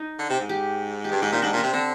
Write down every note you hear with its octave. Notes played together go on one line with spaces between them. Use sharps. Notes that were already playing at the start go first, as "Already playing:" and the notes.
Already playing: D#4
D3
C3
G#2
G4
G4
G2 G#4
G#2 G4
A#2 D#4
G#2 D4
A#2 D4
C3
D3 C4